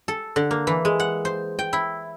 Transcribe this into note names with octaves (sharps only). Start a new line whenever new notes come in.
A4
D3
A#3
E3
G#3
F#5
C5
G5
E4